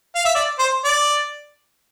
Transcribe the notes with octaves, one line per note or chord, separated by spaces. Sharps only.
F5
E5
D5
C5
D5